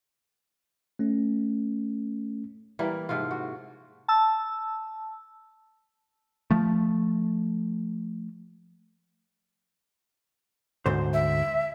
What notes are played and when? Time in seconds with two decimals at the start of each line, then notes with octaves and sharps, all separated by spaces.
0.99 A3 C#4
2.79 E3 G3 A#3 D5
3.09 G#2 C3 F3 F4
3.31 F#4
4.08 A5 E6
6.51 F3 A3
10.86 D2 G#2 C5
11.13 E5